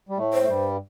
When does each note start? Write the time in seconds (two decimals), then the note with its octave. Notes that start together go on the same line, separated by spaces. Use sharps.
0.09 G3
0.17 A2 A3
0.33 C5
0.43 A3
0.48 G2 G3